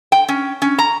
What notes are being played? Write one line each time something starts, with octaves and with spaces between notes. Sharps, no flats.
G5
C#4
C#4
A#5